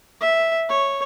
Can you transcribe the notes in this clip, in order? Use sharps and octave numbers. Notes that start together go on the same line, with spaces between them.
E5
C#5